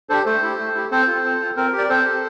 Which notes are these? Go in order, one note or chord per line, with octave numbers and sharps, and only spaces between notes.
D4 G4 A4 C5
A3 A4 C5
E4 G4
A3
E4 G4
C4 A4 C5
F4
C4
F4
C4 A#4
G4
D5
C4 A4 C5
G4